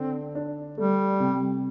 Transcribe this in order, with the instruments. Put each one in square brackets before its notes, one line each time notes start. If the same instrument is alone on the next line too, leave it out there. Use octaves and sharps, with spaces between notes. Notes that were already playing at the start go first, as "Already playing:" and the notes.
Already playing: [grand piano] D3 D4 [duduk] C4
[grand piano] D4
[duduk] G3 [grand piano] A3
[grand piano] C3